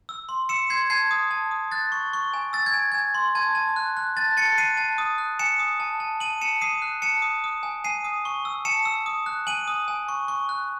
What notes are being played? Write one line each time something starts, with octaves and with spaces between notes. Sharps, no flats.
E6
C6
E6 C#7 E7
C6 G#6 C7
A5 G#6 C7
D#6
A5
D#6
F#6 A6
C#6
C#6
G#5
E6 A6
G#6
G#5
G#5 G#6
C6
A5 G#6
A5
F#6
F#6
A5 A6
A5 A6 C#7
F#6 C7 D#7
A5
D#6
F#6
G#5 C#7 E7
D#6
A5
A5
A5 D#7 F#7
A5 C#7 E7
D#6 C7 D#7
F#6
A5 C#7 E7
D#6
D#6
G#5
G#5 C7 D#7
D#6
C#6
E6
A5 C#7 E7
E6
D#6
F#6
G#5 D#7 F#7
D#6
G#5
C#6
C#6
F#6